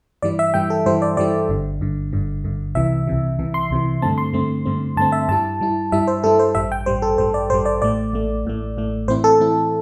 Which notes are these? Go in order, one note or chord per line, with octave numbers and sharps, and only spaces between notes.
G2 E3 G3 E4 D5
E5
G2 E3 G3 E4 G5
A4
G2 E3 G3 E4 C5
D5
G2 E3 G3 E4 D5
G1 G2 D3
G1 G2 D3
G1 G2 D3
G1 G2 D3
C2 C3 E3 E5
C2 C3 E3
C2 C3 E3
C6
C2 C3 E3
G2 D3 A3 C4 A5
C6
G2 D3 A3 C4
G2 D3 A3 C4
G2 D3 A3 C4 A5
E5
G2 G3 E4 A5
G2 G3 E4
G2 G3 E4 E5
C5
G2 G3 E4 A4
C5
A1 G2 G3 E5
G5
A1 G2 G3 C5
A4
A1 G2 G3 C5
D5
A1 G2 G3 C5
D5
A1 A2 A3 D5
A1 A2 A3
A1 A2 A3
A1 A2 A3
A2 E3 C4 E4 C5
A4
A2 E3 C4 E4